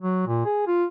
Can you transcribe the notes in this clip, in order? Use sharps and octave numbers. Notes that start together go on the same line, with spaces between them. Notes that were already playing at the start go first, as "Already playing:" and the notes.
F#3
A#2
G#4
F4